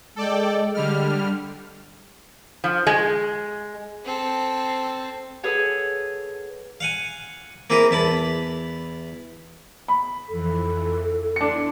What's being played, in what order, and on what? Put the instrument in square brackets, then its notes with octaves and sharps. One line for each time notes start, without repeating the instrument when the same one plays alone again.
[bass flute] G#3 [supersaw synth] A4 D5 G5
[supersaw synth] D3 G3 F6
[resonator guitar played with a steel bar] F3
G#3
[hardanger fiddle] C4 A4
[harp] G#4 A4 B4 C#5 F#5 G#5
[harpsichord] F5 F#5 G#5
A#3 C4 E4 G#4 A#4
E2 E4 A5 B5
[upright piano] B5
[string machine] F2 E3 [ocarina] A4
[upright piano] D4 C#7 [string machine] E4 C6